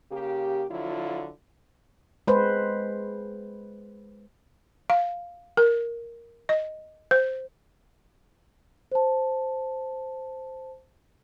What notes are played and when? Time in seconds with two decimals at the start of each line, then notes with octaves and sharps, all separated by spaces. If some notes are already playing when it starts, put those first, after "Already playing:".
0.11 C#3 A#3 G4
0.70 D3 F3 F#3 E4 F4
2.27 G#3 B4 C5
4.90 F5
5.57 A#4
6.49 D#5
7.11 C5
8.92 C5 A5